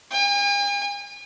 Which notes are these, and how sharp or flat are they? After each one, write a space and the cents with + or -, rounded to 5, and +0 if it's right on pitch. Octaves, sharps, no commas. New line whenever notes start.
G#5 -45